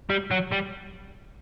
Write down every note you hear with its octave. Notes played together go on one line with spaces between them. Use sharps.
G3
F#3
G3